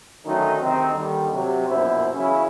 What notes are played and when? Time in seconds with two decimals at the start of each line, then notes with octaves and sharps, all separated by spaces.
0.25 D3 D#3 F#3 A3 C#4 D#4
0.61 D2 C3 D#3 C4 D#4
0.92 D#2 D3 D#3 G3
1.32 C3 F#3
1.68 A#1 F#2 B2 E4 C5
2.14 E2 C#3 F#3 C#4 E4